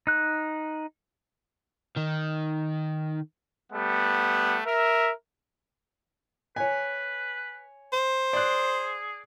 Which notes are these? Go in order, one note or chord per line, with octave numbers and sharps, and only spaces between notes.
D#4 F#6
D#3
G3 A3 B3 F#5
A#4 E5
B4 C#5 G#5
C5
G#4 D5 F#6